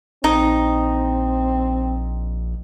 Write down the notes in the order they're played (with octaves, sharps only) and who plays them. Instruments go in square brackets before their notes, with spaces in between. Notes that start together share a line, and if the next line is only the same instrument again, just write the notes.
[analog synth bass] A#1 [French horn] C4 [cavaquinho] D#4